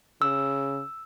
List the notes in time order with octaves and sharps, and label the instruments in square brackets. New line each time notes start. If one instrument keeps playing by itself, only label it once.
[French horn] C#3 [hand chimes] E6